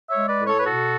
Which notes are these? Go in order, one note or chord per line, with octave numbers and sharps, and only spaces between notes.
C#5 E5
G#3
B4 D5
A2
A4 C#5
B4
B2 F#4 A4